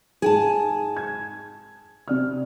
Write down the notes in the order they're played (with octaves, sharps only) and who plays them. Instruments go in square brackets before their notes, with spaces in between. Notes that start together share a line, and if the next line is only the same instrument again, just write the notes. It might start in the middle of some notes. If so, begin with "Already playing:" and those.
[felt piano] G#2 [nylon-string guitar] G#4 G5 A5
[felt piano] G#6
C3 D5 F6